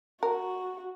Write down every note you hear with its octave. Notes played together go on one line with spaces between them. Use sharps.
F#4 A#4